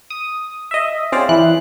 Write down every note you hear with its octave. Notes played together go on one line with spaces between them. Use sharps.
D#6
D#5 E5
C4 C#4 G#4 C5 D5 F5
E3 F#6